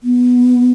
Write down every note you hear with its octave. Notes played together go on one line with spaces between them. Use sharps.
B3